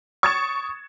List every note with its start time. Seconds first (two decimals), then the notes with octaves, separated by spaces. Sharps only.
0.23 C#6 D#6 G#6 A6 C#7 E7